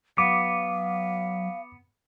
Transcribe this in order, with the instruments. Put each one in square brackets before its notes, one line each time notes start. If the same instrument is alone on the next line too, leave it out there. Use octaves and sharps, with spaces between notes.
[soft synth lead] F#3 [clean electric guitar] B3 [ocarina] F5 [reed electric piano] D6